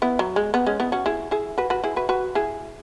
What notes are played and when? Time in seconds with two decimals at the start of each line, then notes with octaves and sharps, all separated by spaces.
0.02 B3 E4
0.19 F#3
0.36 G#3
0.54 B3
0.66 G#3 C#4
0.80 B3 E4
0.92 C#4 F#4
1.06 E4 G#4
1.31 E4 G#4
1.58 F#4 B4
1.70 F#4 B4
1.83 E4 G#4
1.96 F#4 B4
2.09 F#4 B4
2.35 E4 G#4